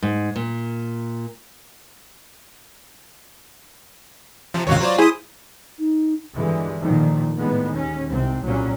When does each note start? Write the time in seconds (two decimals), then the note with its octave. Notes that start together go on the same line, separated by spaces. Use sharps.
0.03 G#2
0.36 A#2
4.54 C3 F3
4.67 D#2 G#2 C3 F4 F#4 C#5
4.81 F#3 C5 D5
4.98 E4 G#4 C5 D#6
5.79 D#4
6.35 G2 D3 E3 G#3
6.81 A#2 D3 D#3 F3
7.38 A2 D3 D#3 G#3 B3
7.75 D#2 C#4
8.09 C2 G#2 C3 C4
8.44 C2 A#2 F#3 G3 A#3 C#4